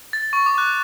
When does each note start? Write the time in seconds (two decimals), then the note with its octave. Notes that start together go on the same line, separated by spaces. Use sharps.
0.13 A6
0.33 C#6
0.46 D6
0.58 F#6